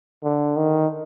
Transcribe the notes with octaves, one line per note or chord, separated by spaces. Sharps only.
D3
D#3